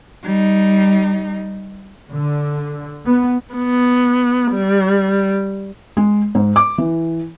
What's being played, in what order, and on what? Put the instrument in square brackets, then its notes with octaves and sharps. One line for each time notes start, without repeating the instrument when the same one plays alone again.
[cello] G3 D#4
[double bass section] D3
B3
[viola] B3
G3
[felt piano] G#3
G#2
D6
E3